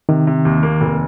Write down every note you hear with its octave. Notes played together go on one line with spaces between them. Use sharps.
C3 D#3
C3
D#2
A#3
F1